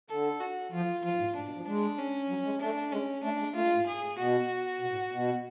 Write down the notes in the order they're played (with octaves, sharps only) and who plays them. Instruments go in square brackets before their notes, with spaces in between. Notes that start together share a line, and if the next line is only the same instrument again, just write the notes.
[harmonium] D3 [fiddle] A4
[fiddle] F#4
[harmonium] F3 [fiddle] F4
[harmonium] F3 [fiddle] F4
[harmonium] G#2
A2
[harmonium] G#2 [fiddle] D4
[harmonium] B2
F3
[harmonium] G#3 [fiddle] D4
[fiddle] C#4
[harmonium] F#3
G#3
[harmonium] A3 [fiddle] D4
[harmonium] G#3 [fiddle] C#4
[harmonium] A3 [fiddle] D4
[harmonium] G#3
[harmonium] A3 [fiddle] F4
[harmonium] G#3
A2
[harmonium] G#2 [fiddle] G#4
[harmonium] A2
[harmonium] B2 [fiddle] F#4
[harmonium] B2
A2
B2